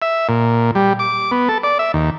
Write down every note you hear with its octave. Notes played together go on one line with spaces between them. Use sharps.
E5
A#2
G3
D6
B3
A4
D5
E5
D#2